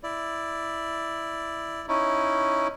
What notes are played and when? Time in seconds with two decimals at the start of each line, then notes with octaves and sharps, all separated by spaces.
0.03 E4 D5
1.88 C#4 D#4 E4